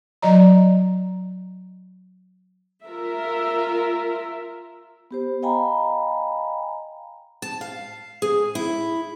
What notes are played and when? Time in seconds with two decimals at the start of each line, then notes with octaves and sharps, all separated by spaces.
0.22 F#3 D5 D#5 A#5
2.83 F4 A#4 E5
5.11 B3 G4 C5
5.42 D#5 F5 G5 G#5 A#5 B5
7.42 A5
7.61 F5
8.22 G#4
8.55 E4